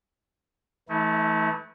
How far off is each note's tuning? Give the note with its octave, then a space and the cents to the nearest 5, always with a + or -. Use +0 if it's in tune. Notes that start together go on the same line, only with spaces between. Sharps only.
E3 +0 A3 -10 D#4 +45